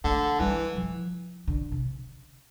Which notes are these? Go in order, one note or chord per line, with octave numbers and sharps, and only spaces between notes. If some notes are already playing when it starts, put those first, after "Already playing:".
D3 A3
E3 G3
F3
D3
C3